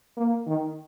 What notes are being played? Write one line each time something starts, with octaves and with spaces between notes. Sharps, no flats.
A#3
D#3